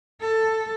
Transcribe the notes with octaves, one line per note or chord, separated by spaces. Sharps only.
A4